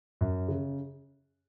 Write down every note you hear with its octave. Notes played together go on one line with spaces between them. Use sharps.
F#2
C#3